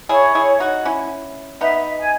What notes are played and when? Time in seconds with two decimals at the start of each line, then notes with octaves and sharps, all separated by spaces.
0.09 E4 G#4 C#5
0.35 E4 G#4
0.60 D#4 F#4
0.85 C#4 E4
1.61 B3 D#4 E5
1.99 G#5